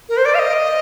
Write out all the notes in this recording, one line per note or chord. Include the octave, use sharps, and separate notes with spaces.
A#4
C5
D5
F5
D#5